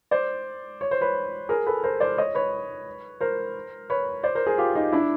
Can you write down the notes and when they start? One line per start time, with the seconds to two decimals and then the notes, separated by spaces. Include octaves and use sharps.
0.11 C5 D5
0.81 C#5
0.91 C5
1.01 B4 C#5
1.49 G#4 A#4
1.66 A4 B4
1.83 A#4 C5
2.00 C5 D5
2.18 C#5 D#5
2.35 B4 C#5
3.20 A#4 C5
3.90 B4 C#5
4.23 C5 D5
4.35 A#4 C5
4.47 G#4 A#4
4.58 F4 G4
4.75 D#4 F4
4.92 D4 E4